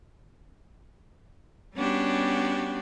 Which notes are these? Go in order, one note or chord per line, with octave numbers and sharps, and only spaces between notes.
G3 B3 C#4 D4 F#4 G4